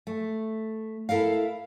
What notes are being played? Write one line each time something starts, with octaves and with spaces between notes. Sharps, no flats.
A3
E4 A4 A#4 F5